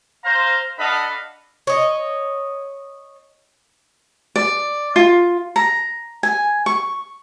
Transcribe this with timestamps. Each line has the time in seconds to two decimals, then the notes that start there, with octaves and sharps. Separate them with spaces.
0.25 C5 F5 A#5
0.79 D4 A4 D#5 F5 F#5 B5
1.67 C#5 D#5
4.36 D5
4.96 F4
5.56 A#5
6.23 G#5
6.66 C#6